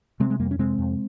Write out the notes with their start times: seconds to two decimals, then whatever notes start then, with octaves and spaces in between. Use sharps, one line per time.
0.20 C3 G#3 C4
0.30 G#3
0.40 F2 G3 A#3
0.51 C#4
0.59 C3 G#3 C4
0.78 F2